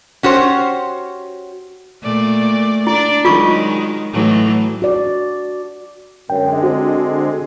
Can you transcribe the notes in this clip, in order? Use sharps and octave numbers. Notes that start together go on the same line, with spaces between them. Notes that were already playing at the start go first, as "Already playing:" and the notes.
C#4 F#4 G4 C5
A#2 A3 D5
D4 E4 D5
D#3 F#3 G#3 F4 C#6
A2 E3 F#3
F#4 D5
F#2 D3 G#3 G5
C4 F#4